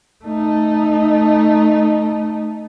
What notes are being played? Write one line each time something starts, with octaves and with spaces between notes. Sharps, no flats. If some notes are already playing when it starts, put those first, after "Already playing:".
A3 D#4